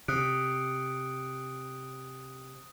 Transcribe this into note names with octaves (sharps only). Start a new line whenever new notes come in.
C3 D#6 F#6 D7